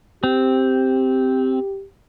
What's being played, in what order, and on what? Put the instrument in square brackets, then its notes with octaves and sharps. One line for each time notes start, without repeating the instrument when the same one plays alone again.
[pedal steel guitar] C4 [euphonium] G4